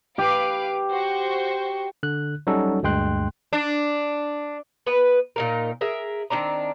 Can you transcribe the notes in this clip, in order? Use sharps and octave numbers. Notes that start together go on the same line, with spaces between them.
G4 B4 F5 D7
F#4 C5 C#6
D3 F#6
F#3 G3 C#4 D#4 F#4 A4
D2 G2 G#3 G5 C6 F#6
D4
B3 B4
A#2 D#4 A#4
G#4 A#4 E5
D#3 C4 D4 A#5